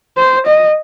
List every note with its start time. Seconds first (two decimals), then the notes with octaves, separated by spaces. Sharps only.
0.17 C5
0.47 D#5